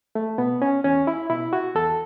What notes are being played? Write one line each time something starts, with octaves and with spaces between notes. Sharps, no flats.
A3
B2 B3
C#4
E2 C#4
E4
B2 E4
F#4
E2 A4